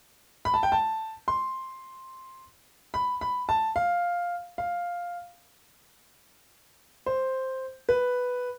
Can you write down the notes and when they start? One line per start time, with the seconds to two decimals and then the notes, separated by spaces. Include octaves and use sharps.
0.45 B5
0.54 A5
0.63 G5
0.72 A5
1.28 C6
2.94 B5
3.21 B5
3.49 A5
3.76 F5
4.58 F5
7.06 C5
7.89 B4